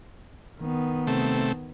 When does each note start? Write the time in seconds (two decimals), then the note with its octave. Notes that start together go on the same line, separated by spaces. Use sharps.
0.59 D#3 B3
1.07 C3 A3